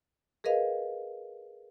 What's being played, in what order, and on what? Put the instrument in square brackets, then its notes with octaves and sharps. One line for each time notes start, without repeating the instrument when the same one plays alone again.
[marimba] G#4 A#4 B4 D#5 F5